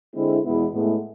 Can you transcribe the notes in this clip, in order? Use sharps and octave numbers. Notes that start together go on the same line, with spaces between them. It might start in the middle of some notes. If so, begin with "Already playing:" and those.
D3 G#3 C4 E4
E2 B2 G#3 B3 E4
A2 G#3 B3